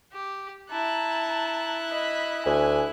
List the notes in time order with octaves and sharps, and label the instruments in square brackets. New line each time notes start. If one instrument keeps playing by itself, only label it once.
[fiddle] G4
[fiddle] E4 F#6 [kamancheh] A5 A#5
[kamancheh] D#5 B5
[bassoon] D2 [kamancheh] G#5